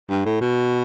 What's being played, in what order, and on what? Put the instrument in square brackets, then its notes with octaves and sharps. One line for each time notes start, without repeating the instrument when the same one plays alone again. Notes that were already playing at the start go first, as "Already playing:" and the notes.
[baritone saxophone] G2
A2
B2